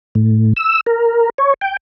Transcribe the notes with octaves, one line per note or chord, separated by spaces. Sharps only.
A2
E6
A#4
C#5
G5